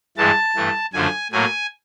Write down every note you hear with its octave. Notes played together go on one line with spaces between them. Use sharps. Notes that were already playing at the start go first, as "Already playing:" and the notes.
G2 E3 G#3 A5
G2 E3 A3
F#2 D3 F3 A3 G#5
A2 F#3 A#3 G#5